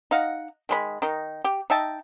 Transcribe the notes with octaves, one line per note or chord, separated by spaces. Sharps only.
D#4 F5 F#5
D#3 G#3 B5
D#3 D#4
G4
D#4 E5 G5 A5